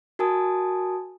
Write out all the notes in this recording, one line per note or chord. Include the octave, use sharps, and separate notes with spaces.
F#4 A#4 G#5 A5 D#6